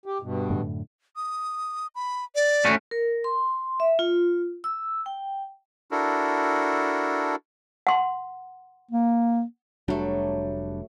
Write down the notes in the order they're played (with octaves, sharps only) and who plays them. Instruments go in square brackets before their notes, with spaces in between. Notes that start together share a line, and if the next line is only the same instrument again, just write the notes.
[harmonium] G4
G2 B2
[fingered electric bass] F#2 A2 D3
[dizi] D#6
B5
D5
[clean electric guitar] A3 C#4 F#4
[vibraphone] A#4
C6
E5
F4
E6
G5
[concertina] D4 E4 F#4 A4 A#4
[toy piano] F#5 C6
[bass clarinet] A#3
[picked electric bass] F1 G3 D4 [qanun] F#3 A3